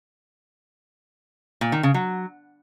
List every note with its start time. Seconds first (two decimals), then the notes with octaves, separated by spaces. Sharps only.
1.61 A#2
1.72 D#3
1.83 C#3
1.94 F#3